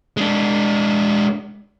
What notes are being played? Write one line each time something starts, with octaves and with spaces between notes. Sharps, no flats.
G#3 D4